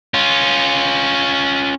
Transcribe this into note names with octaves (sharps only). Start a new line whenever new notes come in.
C#4 F4